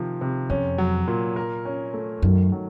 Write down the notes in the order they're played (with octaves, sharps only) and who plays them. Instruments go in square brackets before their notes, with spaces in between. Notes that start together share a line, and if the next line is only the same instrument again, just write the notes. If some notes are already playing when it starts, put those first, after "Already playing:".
Already playing: [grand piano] C3 D#3 F3
C3
[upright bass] F2 [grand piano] C#4
[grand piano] F#3
A#2
A#4
C#4
A3
[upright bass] F#2 [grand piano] D#3
[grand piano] F#3